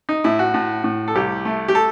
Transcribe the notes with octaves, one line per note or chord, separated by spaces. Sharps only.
D#4
A2 E4
F#4
A2
A2
A4
C2 G4
A3
G4
A4